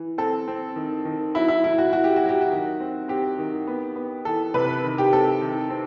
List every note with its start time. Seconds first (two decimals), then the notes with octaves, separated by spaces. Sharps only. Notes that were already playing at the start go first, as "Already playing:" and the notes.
Already playing: E3
0.18 C4 A4
0.48 C4
0.76 D#3
1.05 D#3
1.34 F#3 E4
1.48 E4
1.64 A2 E4
1.78 F#4
1.92 A2 F#4
2.04 G4
2.16 F#4
2.21 F#3
2.29 G4
2.41 F#4
2.51 D#3
2.80 C4
3.08 C4 G4
3.38 D#3
3.67 B3
3.96 B3
4.25 E3 A4
4.54 C3 B4
4.84 D#3
4.98 G4
5.13 C4 A4
5.41 D#3
5.70 C4